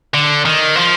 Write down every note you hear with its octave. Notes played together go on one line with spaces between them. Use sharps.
D3
D#3
F3